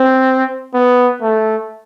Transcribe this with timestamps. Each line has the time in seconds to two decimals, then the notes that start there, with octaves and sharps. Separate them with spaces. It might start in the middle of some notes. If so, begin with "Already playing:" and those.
Already playing: C4
0.74 B3
1.22 A3